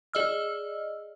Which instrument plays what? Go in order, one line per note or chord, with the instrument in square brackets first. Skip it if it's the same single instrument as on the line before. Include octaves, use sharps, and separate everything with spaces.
[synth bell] G#4 D5 D#5 E6 F6